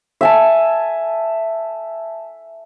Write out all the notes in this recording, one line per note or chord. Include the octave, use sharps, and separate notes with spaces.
E5 G#5 A5